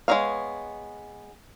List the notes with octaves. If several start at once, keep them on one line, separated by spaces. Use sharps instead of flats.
G#3 B3 D#4 C#5 F5